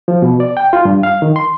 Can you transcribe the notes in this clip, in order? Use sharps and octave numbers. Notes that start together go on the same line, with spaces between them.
F3
B2
D5
G5
F4
G2
F5
D#3
C6